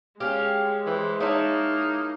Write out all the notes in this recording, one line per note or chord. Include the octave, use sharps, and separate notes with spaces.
G#3 C#4 G4 F5
E3 C5
A#3 D#4 E4 C#5 A5